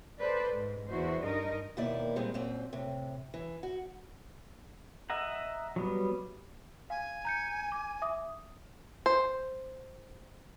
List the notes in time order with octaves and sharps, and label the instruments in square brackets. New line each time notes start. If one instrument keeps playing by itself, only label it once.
[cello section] A4 B4 C5 D5
G#2
E2 E4 F#4 C5
G2 D#4 A#4 D#5
[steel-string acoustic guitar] D#2 B2 D#3 A#3 E4 D5
A#2 G3 G#3 C4
F#2 A#2 C4
A2 C3
E3
F#4
[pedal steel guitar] D#5 E5 F#5 A#5
F#3 G3 B3
[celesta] F5 [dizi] G#5
[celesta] A#5 G6 C#7
D6
E5 D6 D#6
[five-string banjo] C5